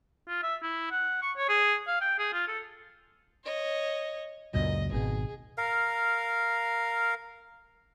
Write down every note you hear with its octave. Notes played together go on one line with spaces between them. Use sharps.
F4
E5
E4
F#5
C#6
C#5
G#4
F5
G5
G#4
F4
A4
C#5 D#5
C#2 F#2 A#2 D#5
G#1 B2 G#4
A#4 F5